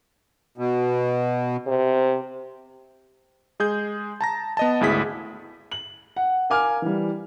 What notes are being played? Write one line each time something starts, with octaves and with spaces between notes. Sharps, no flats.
B2
C3
G#3 G#4 G6
A5 A#5 A#6
B3 D#5 A5
G#1 D2 E4 G#4 B6
F#7
F#5
A#4 F5 G#5 D6 F6
E3 G3